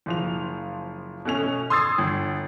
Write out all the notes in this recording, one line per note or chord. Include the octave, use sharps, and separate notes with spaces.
F#1 F3 F7
B2 A3 C#4 F7
C6 D#6 E6 G#6 A6 C7
G1